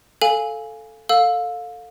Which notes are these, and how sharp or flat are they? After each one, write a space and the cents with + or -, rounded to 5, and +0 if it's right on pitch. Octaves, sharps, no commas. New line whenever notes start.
A4 +0 F5 +0 G#5 +0
A4 +15 F5 +25 E6 +0